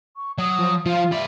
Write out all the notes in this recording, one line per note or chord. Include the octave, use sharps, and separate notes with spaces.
C#6
F#3 D#6
F3
F3 F4 F5
B4 D5 E5